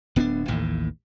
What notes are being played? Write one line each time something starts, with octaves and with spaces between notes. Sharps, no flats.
D1 B3 C#4 D4
A1 D#2 A2